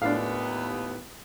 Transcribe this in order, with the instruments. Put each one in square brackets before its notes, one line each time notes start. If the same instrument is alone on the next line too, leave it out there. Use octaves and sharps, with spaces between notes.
[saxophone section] D#2 B3 [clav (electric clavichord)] A2 E4 F4 [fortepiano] D4 F5